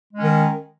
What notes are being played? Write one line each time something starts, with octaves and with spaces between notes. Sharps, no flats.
D#3 G#3 C#4